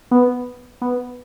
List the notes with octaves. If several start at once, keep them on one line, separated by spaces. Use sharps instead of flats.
B3
B3